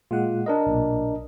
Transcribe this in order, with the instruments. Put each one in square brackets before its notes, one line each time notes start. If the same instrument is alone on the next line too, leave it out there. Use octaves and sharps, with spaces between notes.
[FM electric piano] A#2 G#3 F#5 [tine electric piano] F4
[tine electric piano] D4 A#4 D#5
[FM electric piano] B1 A#2